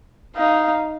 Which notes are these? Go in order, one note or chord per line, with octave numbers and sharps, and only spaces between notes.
D#4 F5